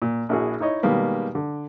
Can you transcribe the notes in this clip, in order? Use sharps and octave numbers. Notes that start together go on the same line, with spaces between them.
A#2
A#1 E4 F#4 G#4
D#4 E4 C#5 D#5
B2 D#3 G3 G#3 A#3 B3
D3